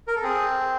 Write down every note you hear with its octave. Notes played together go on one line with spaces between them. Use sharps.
A#4
A4
C4 G#4